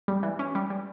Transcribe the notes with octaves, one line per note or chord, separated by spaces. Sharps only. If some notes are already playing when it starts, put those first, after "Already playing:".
G3
E3
C#4
G3
G3